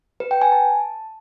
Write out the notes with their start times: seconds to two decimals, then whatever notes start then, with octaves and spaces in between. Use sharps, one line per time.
0.20 B4
0.31 G5
0.42 G#5
0.52 A5